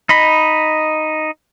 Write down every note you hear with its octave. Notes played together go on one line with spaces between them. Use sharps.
D#4 D#5 B5